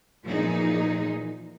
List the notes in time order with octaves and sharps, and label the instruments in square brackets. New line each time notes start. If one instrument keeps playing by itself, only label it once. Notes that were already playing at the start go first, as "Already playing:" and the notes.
[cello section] A#2 E3 F3 D#4 G#4